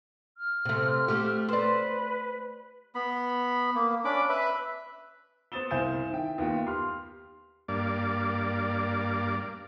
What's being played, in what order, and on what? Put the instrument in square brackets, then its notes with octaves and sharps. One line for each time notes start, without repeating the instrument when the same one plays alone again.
[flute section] F6
[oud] C3 A3
A3 G4
[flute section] B4 [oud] C5 D5
[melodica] B3 B5
A#3
C#4 D4 B5 D6
B4 E5 B5
[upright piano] B3 C5 D#6 A6 E7 G7
C2 C5 F5 G#5 G6 E7
D#3 E4 G5
D#2 B3 F4 G5
G4 C6 F6
[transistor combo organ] G2 A#3 D5